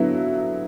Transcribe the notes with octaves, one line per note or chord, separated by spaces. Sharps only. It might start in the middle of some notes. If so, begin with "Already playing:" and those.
Already playing: D3 F#3 B3 E4